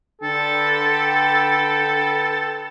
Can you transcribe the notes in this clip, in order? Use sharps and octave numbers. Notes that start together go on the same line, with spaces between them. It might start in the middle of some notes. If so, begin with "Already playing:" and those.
D3 A4 B4 G5